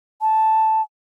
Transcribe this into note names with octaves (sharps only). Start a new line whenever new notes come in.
A5